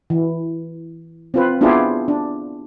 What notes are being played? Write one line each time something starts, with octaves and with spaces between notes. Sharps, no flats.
E3
C4 F4 B4
B3 D4 E4 F4 G4 G#4
D4